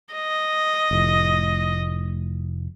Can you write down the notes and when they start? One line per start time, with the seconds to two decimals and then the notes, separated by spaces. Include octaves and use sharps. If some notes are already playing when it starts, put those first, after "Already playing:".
0.14 D#5
0.91 F1 A2